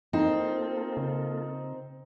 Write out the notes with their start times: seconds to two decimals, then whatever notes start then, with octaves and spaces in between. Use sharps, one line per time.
0.13 A#3 C4 D#4 F4 A4
0.97 C#3